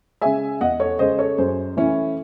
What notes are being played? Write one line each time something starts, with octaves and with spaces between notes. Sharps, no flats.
C#3 G#3 E5 G#5
E2 D#5 F#5
A4 C#5
C#3 G#3 C5 D#5
A4 C#5
F#2 G#4 C5
E3 A3 C#4 E4